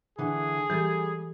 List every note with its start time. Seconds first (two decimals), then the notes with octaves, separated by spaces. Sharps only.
0.19 D3 E3 G#4
0.70 E3 G3 G4 A4